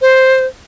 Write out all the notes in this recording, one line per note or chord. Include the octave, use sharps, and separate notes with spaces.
C5